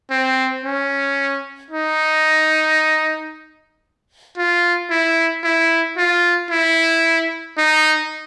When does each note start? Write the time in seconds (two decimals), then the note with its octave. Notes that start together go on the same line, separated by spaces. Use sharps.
0.11 C4
0.64 C#4
1.71 D#4
4.38 F4
4.91 E4
5.44 E4
5.97 F4
6.51 E4
7.58 D#4